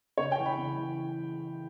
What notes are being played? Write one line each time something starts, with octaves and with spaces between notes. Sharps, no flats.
C#3 C#5
G5
E3
B5
C#3
E3